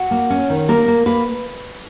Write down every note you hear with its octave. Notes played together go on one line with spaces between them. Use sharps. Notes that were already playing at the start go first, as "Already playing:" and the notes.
Already playing: F#4
A#3
C#4
D#3
A#3 A#4
A#3
A#3 B4